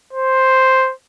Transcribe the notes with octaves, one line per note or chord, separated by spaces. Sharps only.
C5